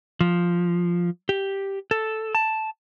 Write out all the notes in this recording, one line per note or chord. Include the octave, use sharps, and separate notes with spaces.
F3
G4
A4
A5